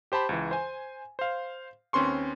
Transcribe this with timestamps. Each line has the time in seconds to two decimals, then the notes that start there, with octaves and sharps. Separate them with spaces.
0.12 G4 C5 A5 B5
0.29 C#2 E3
0.51 C5 G#5
1.19 C5 F5
1.93 D#2 C4 C#4 B4 C6 C#6